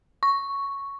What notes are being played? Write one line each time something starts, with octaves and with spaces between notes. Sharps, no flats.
C#6